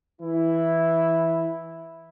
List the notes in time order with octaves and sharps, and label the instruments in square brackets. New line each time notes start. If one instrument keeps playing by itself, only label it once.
[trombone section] E3 E4